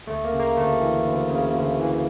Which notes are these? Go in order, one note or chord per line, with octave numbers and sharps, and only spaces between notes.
D2 A3
A#3
C#3
A#3
D2 A3
E3
D2
C#3
D2
E3